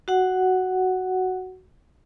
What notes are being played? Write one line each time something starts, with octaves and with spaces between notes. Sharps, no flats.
F#4 F#5